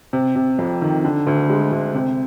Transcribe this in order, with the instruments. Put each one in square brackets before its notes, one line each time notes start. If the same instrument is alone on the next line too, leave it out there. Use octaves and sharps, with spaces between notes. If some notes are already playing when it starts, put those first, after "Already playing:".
[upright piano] C3
C3
F2
D#3
D3
D2
G#3
D2
C3